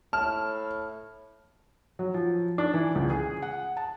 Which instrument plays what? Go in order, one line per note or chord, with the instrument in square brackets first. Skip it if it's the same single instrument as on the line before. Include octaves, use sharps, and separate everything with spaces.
[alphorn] A2 [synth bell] A5 [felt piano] F6
[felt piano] F#3
F3
D4
E3
C#2
G#4
F#5
A5